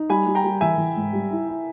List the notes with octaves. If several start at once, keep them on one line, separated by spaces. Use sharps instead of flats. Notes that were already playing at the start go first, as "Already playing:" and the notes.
Already playing: D#4
G3 G#5 B5
G3
G5 A#5
G3
E3 E5 G#5
E3
G#2
G3
E4
E4